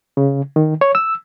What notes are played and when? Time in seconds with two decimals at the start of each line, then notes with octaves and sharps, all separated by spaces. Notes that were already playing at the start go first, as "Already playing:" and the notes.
0.17 C#3
0.56 D#3
0.81 C#5
0.95 E6